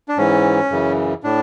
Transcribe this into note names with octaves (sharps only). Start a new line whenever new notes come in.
D4
G#2 E3 C#4
F#2 C#3 E3
A2 D4